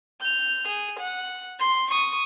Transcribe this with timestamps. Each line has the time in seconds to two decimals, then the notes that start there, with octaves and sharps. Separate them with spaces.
0.21 G6 F7
0.67 G#4
0.99 F#5
1.59 C6
1.90 C#6 D#6